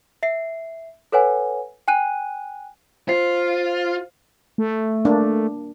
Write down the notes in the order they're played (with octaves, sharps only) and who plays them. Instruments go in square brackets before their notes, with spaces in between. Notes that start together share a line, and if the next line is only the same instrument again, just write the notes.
[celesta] E5 C7
A4 B4 C#5 F#5 G#5
G5 G#5 F#6 D#7
[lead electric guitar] F4 [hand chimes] C5 C7
[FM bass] A3
[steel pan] A#3 D4